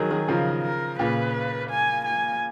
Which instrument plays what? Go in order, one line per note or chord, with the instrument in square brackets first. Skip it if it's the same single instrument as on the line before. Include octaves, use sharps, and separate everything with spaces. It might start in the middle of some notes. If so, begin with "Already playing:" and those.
Already playing: [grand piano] D#3 F#3 [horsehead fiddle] G#4
[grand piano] D#3 F#3
[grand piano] C#3 F3 [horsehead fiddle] A#4
[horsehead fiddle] A#4
[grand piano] A#2 C#3 [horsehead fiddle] B4
[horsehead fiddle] G#5
G#5